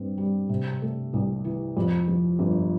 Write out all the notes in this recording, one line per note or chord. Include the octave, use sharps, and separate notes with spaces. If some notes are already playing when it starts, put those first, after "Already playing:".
Already playing: G2 C4
G3
C3
A3
C2
E3
F2
F3
G1